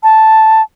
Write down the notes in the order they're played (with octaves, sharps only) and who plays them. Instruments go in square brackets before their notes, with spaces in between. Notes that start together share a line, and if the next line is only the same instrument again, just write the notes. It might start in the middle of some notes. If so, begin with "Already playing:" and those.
[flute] A5